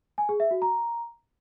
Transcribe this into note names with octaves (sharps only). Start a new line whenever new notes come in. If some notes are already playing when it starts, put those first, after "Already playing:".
G#5
G#4
E5
F#4
A#5